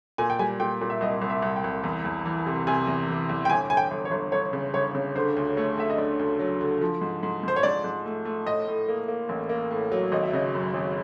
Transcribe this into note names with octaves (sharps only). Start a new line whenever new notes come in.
A#2 G#5
G5
G3 G#5
A#2 G5
A#2
E5
C2 D#5
C2
E5
C2
G5
C2
E2
E2
E3
C3
C3 G#5
E2
E3
E2
G5
G1 G#5
G1 G#5
G5
G1
C#5
G1
G1 C#5
C#3
G1 C#5
C#3
D3 C5
D2
A3 C#5
D2 E5
D#5
D3 D5
D2
F#3
D3
F3
G#2
G#2
G#2 C5
C#5
G#2 D5
G#2
A3
A3
A2 D#5
A2
A#3
A#3
A1
A#3
A2
F#3
G#1 D#5
E5
C#3 D#5
F#2
G#1